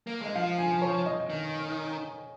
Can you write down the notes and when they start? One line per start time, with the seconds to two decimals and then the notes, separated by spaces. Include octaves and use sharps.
0.07 A#3
0.21 G#3 D#5
0.35 F3 F5
0.58 G#5
0.82 C#5
1.06 D#5
1.30 D#3